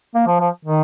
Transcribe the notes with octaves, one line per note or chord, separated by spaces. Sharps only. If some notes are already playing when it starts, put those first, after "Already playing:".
A#3
F3
F3
D#3